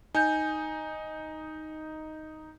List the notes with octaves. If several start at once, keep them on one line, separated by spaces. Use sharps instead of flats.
D#4 G#5 G6